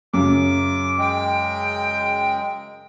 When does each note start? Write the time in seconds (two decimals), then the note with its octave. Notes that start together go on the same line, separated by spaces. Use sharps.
0.14 F#2 C#3 D6
0.99 G#3 G5